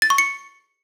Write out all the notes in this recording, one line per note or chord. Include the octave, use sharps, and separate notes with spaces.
A6
C#6
C#7